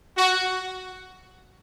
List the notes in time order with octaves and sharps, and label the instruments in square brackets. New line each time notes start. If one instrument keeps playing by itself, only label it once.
[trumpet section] F#4